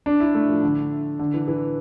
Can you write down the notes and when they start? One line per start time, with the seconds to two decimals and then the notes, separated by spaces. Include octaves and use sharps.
0.06 D4
0.20 E4
0.35 A3
0.49 F3
0.63 D3
1.19 D3
1.34 E3
1.48 E3